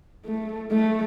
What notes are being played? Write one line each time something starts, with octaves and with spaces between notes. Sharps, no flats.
A3
A3